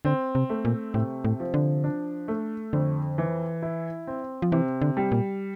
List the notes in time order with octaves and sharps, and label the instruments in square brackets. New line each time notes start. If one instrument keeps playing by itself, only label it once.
[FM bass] D3 [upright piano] C4
[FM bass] C3
[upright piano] A3
[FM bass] A#2
[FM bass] A2 [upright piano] C3
[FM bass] A2
[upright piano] F3
[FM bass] D3
[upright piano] D4
A3
[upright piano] F2 [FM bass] D3
[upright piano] E3
E4
C4
[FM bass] F3
[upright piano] C3 [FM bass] E3
[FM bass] D3
[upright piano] G3
[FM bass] A#2